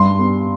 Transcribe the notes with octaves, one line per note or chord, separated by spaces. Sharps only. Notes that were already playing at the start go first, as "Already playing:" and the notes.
Already playing: G2 C6
B3